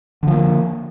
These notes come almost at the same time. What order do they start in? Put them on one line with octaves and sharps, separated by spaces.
D3 F3 A#3